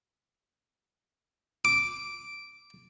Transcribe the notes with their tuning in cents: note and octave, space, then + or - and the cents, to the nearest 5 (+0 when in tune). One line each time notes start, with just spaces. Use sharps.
D6 -5